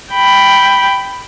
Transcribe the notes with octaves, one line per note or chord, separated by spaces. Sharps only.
G5 B5